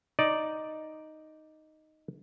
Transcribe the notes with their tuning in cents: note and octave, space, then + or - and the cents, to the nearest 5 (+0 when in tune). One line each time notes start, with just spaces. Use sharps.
D#4 +0 D5 +0